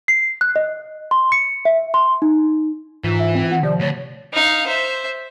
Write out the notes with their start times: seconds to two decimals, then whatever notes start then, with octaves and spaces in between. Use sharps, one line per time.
0.08 C7
0.41 F#6
0.56 D#5
1.11 C6
1.32 C#7
1.65 E5
1.94 C6
2.22 D#4
3.04 G#2 E3 F4
3.19 E5
3.35 C4
3.52 F#5
3.63 C3 F3 D5
3.80 D2 C#5
4.33 D#4 F5
4.67 C5 E5